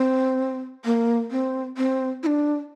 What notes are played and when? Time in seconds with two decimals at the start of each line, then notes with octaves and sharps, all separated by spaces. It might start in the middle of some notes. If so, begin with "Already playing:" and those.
Already playing: C4
0.85 A#3
1.31 C4
1.77 C4
2.23 E4
2.26 D4